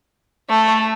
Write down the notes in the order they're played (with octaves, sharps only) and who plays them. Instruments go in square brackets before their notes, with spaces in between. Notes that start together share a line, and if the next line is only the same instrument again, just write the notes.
[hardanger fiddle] A3